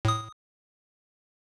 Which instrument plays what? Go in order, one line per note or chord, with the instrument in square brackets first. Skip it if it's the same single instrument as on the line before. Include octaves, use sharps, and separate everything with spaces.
[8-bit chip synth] A2 D#6